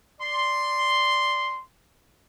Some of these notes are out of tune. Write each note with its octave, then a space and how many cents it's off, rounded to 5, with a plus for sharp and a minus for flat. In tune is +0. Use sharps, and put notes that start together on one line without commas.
D5 +0 C6 +0